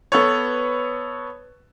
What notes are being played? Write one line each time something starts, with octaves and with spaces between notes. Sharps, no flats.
B3 A4 B4 C#5